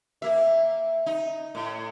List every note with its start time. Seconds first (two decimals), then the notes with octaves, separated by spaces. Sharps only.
0.22 A#3 E5
1.06 D#4
1.55 A2